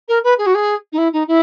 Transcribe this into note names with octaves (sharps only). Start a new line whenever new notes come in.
A#4
B4
G#4
F#4
G#4
D#4
E4
D#4
E4